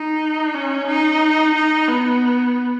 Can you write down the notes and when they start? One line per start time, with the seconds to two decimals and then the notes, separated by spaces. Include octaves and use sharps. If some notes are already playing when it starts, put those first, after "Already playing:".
Already playing: D#4
0.55 C#4
0.87 D#4
1.55 D#4
1.88 B3